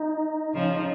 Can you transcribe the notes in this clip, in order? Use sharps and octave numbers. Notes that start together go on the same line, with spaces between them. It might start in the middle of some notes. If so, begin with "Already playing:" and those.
Already playing: D#4
C#3 F3